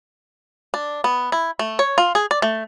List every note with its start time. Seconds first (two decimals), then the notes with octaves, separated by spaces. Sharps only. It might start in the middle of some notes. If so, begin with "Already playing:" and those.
0.74 D4
1.04 B3
1.32 E4
1.59 A3
1.79 C#5
1.98 F4
2.15 G#4
2.31 D5
2.42 A3